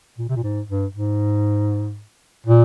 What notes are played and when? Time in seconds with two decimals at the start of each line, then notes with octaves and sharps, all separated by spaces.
0.18 A#2
0.29 C3
0.36 A#2
0.43 G#2
0.69 G2
0.95 G#2
2.46 A#2